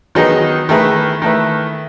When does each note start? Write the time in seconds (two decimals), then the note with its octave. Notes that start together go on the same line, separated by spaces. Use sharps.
0.15 D#3 F#3 B3 D#4 G#4
0.69 D#3 A3 E4 G#4 B4
1.22 D#3 A3 E4 B4